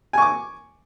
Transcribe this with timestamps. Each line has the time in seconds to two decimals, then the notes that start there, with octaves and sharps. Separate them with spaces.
0.13 G#5
0.18 C#6
0.22 D6